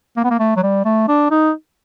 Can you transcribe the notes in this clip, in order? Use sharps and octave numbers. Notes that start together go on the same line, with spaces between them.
A#3
B3
A#3
A3
F#3
G3
A3
D4
D#4